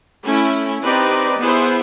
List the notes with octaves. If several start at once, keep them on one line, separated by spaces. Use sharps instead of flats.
A3 C#4 E4
C4 D#4 G4 B4 D5
B3 E4 G#4 C5